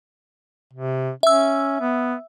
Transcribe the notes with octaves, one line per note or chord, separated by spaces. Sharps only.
C3
C#4 E5 E6
B3